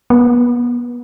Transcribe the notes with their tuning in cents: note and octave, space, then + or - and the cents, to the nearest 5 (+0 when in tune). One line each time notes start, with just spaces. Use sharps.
B3 -30